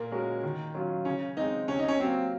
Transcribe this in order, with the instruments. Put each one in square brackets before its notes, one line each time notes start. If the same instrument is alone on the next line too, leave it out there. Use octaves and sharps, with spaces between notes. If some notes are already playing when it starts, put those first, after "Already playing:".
Already playing: [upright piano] A#2 [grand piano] A#3
[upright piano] G#3 C#4 F#4 A#4
D#3
F#3 C#4 F4
[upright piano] C#3 [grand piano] C#4
[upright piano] G#3 C4 [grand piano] D#4
[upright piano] C3 [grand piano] C#4
[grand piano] D#4
C#4
[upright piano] F#3 A#3 [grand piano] C4